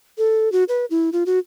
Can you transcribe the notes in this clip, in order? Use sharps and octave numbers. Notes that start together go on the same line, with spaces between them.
A4
F#4
B4
E4
F4
F#4